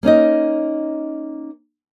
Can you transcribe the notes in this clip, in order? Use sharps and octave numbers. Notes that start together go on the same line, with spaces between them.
A#3 C#4 D#4 D#5